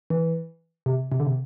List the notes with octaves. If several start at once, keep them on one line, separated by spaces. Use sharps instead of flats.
E3
C3
C3
D3
C3